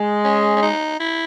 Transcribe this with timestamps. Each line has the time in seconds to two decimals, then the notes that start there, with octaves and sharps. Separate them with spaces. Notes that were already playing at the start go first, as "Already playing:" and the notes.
Already playing: G#3
0.25 C#4
0.56 C#4
0.62 D#4
1.00 E4